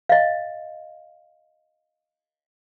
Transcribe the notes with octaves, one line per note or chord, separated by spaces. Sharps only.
D#5 F5